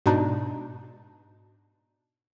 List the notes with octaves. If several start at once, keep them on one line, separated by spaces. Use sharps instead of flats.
G#2 B2 D4 D#4